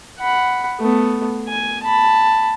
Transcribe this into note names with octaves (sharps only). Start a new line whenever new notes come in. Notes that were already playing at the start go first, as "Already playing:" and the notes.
F#5 B5
A3 B3
G#5
A5 B5